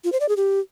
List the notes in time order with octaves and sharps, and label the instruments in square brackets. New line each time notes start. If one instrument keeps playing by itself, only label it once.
[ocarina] F4
C5
D5
G#4
G4